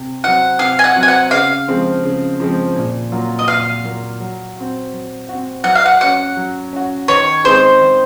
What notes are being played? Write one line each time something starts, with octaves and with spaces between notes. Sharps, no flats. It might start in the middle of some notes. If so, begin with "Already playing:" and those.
Already playing: C3
F#3 C4 F#4 F#5
C3 F5
G#5
F#5
F#3 C4 F#4
G#5
F#5
C#3 F5
F3 G#3 C4
C#3
F3 G#3 C4
A#2
F#3 A#3 F4
D#5
A#2 F5
F#3 A#3 F4
F#3
C4 F#4
F#3
C4 F#4
F#3 F#5
F5
F#5
C#4 F#4 F#5
F#3
C#4 F#4
D#3 C#5
G#3 C4 D#4 G#4 C5
D#3